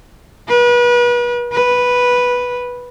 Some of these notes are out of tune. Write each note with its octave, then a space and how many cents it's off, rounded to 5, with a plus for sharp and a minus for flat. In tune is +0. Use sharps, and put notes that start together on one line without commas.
B4 -35
B4 -5